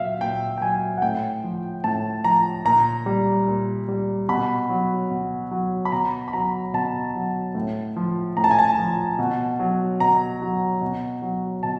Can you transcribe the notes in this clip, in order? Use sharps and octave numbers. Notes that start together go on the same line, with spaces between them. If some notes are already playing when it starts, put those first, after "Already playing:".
Already playing: A#2 F#3 E5 F5
A#2 G5
G5
F#3 G#5
F#5
A2 G5
F3
A2 A5
F3 A#5
A#2 A#5
G3
A#2
G3
B2 B5
F#3
B2
F#3
B5
B2 A#5
B5
F#3 A#5
B2 A5
F#3
A2
F3
A2 A#5
A5
G#5
A5
F3
B2
F#3
B2 A#5
F#3
B2
F#3
B2 A5